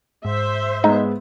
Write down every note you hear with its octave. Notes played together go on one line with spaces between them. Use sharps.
G#2 C5 E5
G#3 B3 D#4